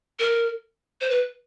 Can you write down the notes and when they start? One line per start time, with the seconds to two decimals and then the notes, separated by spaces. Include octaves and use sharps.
0.19 A#4
1.01 C5
1.10 B4